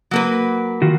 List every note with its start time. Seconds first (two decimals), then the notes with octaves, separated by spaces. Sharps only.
0.11 F#3 A#3 B4
0.82 D#3 F4 F#4